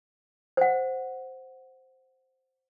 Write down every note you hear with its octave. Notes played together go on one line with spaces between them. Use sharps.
C5 F#5